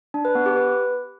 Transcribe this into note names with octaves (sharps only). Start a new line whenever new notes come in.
D4
B4
B3
G4
B4